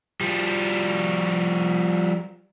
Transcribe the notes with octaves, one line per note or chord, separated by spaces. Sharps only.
F3 G3